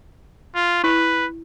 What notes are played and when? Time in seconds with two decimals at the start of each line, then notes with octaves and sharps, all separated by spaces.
0.55 F4
0.84 E4 B4